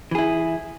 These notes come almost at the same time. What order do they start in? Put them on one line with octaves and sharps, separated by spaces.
E3 G#4 E4